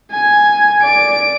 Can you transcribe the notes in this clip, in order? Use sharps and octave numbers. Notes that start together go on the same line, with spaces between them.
G#5
D5 D7